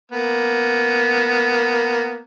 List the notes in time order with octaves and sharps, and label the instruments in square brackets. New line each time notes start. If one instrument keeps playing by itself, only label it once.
[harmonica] A#3 B3